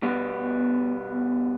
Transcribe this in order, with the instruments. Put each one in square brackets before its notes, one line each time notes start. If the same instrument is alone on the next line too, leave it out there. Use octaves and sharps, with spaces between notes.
[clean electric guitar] B2 G3 B3